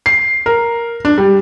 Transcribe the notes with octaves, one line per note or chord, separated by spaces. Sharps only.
C7
A#4
D4
G3